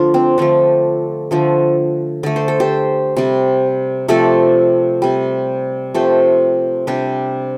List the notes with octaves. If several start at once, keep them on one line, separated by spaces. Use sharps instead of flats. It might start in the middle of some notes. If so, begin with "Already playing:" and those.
Already playing: D3 F3 A3 D4 F4
C4
D3 F3 A3 D4
D3 F3 A3
D3 A3 D5
C5
A4
G4 C5
C3 G3
C3 F3 A3 A4 D5
C3 G3
C3 F3 A3 G4 C5
C3 G3 D4 G4